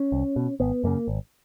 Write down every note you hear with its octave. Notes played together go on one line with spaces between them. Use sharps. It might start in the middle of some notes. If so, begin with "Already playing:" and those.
Already playing: C#4
C2
B2
G#1 B3
F#2 C#3 A#3
G#1